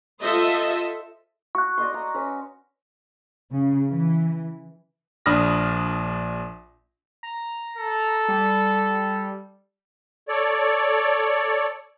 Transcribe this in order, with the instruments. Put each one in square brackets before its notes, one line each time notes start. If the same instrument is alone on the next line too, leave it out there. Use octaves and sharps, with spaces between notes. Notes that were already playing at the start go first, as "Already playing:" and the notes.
[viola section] F4 A4 C5 D#5 E5
[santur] F#4 [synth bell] C#6 F#6
[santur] D5 D#5 C6
A#5
C#4 B4
[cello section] C#3
E3
[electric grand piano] A#1 D4 B5 D#6 F6 A#6
[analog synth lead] A#5
[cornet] A4
[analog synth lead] G3
[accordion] A4 C#5 D5